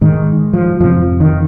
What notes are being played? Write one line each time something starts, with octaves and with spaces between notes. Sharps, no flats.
G#2 D#3
F3
F2 C3 F3
D#3